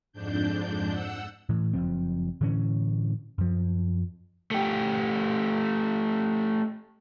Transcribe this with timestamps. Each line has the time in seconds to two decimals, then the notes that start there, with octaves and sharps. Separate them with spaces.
0.13 F2 G#2 D4 G6
0.89 F#5 E6
1.49 A2 E3
1.73 F#1 F2 F3 C4
2.41 A2 D3 E3 C#4
3.38 F#2 F3
4.51 A3 G4